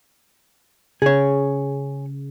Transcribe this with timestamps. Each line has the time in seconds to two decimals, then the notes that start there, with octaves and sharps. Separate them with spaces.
1.02 C#3 G#4 C#5